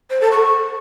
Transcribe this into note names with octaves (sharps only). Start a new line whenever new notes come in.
C5
A4
C#6